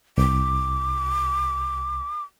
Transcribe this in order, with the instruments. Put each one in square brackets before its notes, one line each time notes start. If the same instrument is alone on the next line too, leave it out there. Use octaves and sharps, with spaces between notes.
[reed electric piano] C2 [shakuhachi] D6